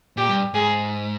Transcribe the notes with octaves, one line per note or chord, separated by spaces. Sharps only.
A#2 G4
G2
G#2 G#4